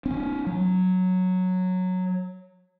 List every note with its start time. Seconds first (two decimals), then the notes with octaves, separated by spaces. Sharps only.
0.06 C4 D4
0.47 F#3